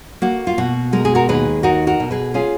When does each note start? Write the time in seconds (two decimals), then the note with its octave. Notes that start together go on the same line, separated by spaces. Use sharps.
0.22 A#3 F#4
0.47 F4
0.58 B2 F#4
0.93 G#3 A#4
1.05 G#4
1.15 F#4 A#4
1.29 D#2 G#4 B4
1.63 D#4 F#4 A#4
1.87 F#4 A#4
2.00 B2
2.11 G#4 B4
2.34 C#4 F4 G#4